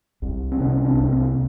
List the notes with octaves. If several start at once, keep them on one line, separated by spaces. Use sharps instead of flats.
C2
C4
C3 B3 C#4
C4 D4
C2
A#3 C4